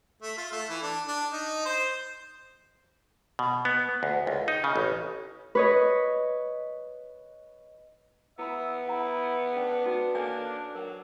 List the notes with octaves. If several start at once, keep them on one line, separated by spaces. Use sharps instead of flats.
A3
F4
A3
E3
D4
D4
D#4
C5
B2
B3
D2
C#2
D#4
C#3
A1
B4 C#5 D#5
B3 E4 E5 B5
E4 F#5 A#5
C#4 D4 B4
D#4 F#4 B4
A#3 A4 C#5 G#5
F#3 A#4 F#5